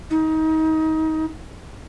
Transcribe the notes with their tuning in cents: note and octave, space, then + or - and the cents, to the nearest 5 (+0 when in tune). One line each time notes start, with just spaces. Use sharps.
D#4 +25